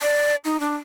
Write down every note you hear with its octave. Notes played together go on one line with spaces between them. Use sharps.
D5
D#4
D4